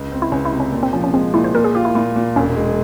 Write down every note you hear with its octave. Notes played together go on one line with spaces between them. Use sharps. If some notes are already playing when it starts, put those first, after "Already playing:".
Already playing: C#2
C4
E4
C#2 C#4
E4
C3
C#4
A#2
C4
F3 C#4
C#4
G#3 C4
A#2 E4
C5
A#2 A#4
G#4
F4 G4
E4
A#2 E4
A#2
E1 C#4
G#3